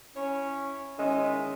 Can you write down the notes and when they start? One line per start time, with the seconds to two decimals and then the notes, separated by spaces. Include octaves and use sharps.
0.16 C#4 E4 C#5
0.99 E2 D#3 G#3 C#4 E5